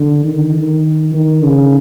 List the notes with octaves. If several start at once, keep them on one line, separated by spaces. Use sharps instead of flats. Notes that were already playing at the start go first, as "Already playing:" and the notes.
Already playing: D3
D#3
D#3
D#3
C#3